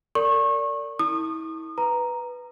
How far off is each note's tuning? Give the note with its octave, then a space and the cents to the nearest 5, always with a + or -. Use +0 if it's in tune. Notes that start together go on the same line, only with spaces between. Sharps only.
A#4 -30 D5 -25 C#6 -30
E4 -35 D#6 -35
B4 +0 A#5 +0